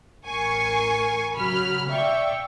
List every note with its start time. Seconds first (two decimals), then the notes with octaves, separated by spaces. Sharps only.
0.25 A1 A#4 G#5 C#6 C7
1.36 C#3 F#3 B5 F6
1.89 D5 E5 F5 G5 C#6